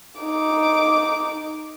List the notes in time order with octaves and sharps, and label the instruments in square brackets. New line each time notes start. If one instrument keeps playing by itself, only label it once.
[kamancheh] D#4 D6